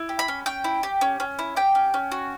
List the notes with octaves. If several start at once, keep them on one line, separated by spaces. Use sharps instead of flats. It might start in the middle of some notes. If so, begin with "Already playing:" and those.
Already playing: E4
G4
B5
C#4
C#4 G5
E4
G4
C#4
C#4
E4
G4 G5
C#4
C#4
F#4